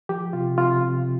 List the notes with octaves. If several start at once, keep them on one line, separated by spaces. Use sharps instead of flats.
F3 G4
C3 F4
C3 F4
C3